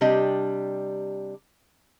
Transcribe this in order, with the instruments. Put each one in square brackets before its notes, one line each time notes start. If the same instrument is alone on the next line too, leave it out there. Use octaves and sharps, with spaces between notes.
[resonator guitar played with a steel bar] C3 G3 D4 G4 D#5